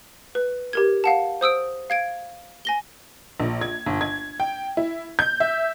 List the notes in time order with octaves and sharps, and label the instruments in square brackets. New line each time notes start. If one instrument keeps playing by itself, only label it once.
[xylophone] B4
G4 A#4 G#6
F5 F#5 A5
C5 D#6 E6 D7
F5 G#6 D7
G#5 A#6 G7
[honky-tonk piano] A#1
G#6
G1
G#6
G5
E4
G6
E5